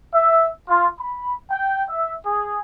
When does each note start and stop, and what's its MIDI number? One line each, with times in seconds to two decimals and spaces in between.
0.14 0.50 76
0.69 0.87 65
1.00 1.34 83
1.50 1.83 79
1.88 2.13 76
2.26 2.61 68